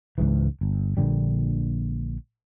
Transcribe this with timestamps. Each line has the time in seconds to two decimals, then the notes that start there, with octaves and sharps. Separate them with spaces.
0.18 C#2 G#2 E3
0.61 G1
0.97 A#1 A#2 D3 G3